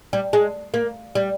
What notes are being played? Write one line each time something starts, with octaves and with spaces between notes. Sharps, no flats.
G3
G#3
A#3
G3